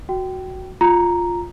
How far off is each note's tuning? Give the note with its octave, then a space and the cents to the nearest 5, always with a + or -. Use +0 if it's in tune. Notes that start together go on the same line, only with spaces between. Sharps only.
F#4 +0 G5 -20
F4 +5 A#5 +0